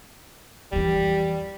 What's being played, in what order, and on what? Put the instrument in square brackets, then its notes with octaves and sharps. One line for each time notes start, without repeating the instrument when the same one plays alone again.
[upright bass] F2 E3 [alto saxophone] G3